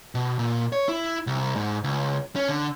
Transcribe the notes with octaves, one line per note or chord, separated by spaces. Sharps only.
B2
A#2
C#5
E4
C2
G#2
C#2
C#4
D3